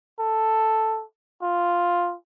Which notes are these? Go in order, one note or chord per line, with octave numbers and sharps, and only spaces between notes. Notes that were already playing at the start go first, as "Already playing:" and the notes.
A4
F4